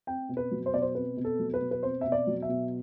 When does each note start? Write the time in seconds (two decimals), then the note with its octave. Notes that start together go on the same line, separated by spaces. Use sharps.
0.07 C4 G5
0.29 B2
0.37 B4
0.51 F#3
0.66 C5
0.74 B2 D5
0.82 C5
0.95 C4 B4
1.17 B2
1.25 A4
1.39 F#3
1.54 B4
1.61 B2
1.71 B4
1.83 C4 C5
2.01 B2 E5
2.12 D5
2.27 F#3
2.42 E5
2.49 B2